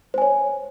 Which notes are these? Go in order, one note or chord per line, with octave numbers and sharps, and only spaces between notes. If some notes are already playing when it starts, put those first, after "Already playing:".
C5 C#5 G#5